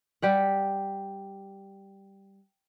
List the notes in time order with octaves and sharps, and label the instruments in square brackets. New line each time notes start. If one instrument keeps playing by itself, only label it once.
[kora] G3 G4 F#5